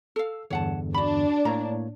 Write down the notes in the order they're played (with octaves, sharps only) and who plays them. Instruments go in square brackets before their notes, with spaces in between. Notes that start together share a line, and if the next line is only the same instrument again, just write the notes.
[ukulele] A4 F5 [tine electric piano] E6
[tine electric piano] E2 G2 D3 [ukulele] C#5 F#5 A5
[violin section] D4 [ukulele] F#4 B5
[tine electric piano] A2 A#3 C#5 [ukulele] A#5